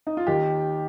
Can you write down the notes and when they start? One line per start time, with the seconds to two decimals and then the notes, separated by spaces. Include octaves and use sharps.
0.07 D#4
0.17 F4
0.27 D#2 D#3 G4